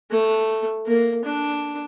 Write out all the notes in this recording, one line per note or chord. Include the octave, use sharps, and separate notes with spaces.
A3
A#3
D4